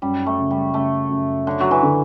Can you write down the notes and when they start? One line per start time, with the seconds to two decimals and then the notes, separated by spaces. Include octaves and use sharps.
0.02 F#2 G3
0.26 A3
0.39 C#3
0.51 G3
0.74 C#3 A3
1.10 F#2
1.47 D3 C#4
1.60 F#3
1.71 E3
1.83 D3